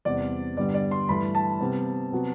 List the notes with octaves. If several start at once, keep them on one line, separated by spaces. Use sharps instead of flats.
E2 C3 G3 D5
G2 D3 G3 B3 D5
D5
C6
G2 E3 A3 B5
A5
C3 G3 B3
C3 F#3 B3